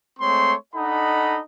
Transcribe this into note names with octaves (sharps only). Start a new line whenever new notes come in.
G#3 A3 C4 C#5 C6
D4 D#4 A4 D#5 F#5 B5